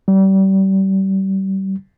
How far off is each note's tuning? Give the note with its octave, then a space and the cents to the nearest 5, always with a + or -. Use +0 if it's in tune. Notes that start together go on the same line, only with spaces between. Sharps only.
G3 -30